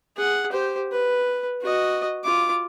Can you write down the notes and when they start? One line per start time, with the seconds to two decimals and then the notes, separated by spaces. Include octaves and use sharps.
0.17 G#4 F#5
0.52 G4 C5
0.92 B4
1.62 F#4 D#5
2.24 F4 D6